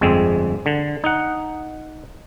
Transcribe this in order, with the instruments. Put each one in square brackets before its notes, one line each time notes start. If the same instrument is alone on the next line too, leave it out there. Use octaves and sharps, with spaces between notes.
[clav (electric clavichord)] G1 F2 G#3 C4
D3
D#4 F#5